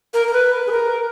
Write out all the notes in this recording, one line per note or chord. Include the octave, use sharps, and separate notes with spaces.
A#4
A#4
B4
G#4
A#4